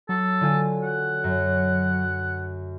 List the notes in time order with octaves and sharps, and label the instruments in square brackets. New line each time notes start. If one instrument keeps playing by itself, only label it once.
[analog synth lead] F#3 [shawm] A4
[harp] D3 F4 G#5
[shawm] F#5
[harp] F#2